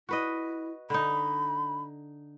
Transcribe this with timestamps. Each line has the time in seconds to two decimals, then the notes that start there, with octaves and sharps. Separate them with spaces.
0.09 E4 F#4 B4 D#5
0.90 D3 D#4 B5